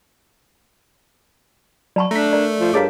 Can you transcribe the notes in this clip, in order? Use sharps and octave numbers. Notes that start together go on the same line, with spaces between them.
F#3 F#4 D5 A5 C#6
A3 D4 A#5 B6
A#4 D5
F3
G2 G#4 A#4 C#5 F5 A5 D6